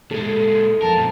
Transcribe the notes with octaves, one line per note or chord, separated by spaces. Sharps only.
A#2 G#3 A4
F2 A#4 A5
D2 A#2